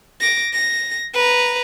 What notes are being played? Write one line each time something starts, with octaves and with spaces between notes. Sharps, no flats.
D6 A#6
A#6
B4 A#5